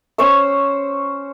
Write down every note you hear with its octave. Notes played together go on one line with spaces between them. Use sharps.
C#4 C5 C#6 E6